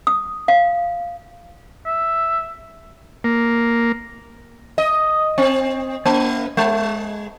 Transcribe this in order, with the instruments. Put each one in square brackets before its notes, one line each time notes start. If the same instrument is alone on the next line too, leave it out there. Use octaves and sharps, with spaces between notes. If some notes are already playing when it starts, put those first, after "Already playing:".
[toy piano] D#6
F5
[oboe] E5
[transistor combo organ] A#3
[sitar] D#5
C4
A#3
G#3